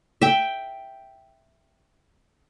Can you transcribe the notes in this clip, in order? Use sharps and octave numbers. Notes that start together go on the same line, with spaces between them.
E5 G5